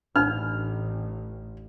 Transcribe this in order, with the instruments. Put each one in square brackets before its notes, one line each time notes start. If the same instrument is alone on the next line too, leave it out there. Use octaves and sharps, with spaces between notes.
[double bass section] A1 [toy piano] D4 D#4 B5 [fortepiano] F6